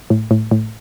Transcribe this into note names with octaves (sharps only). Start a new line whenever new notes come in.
A2
A2
A2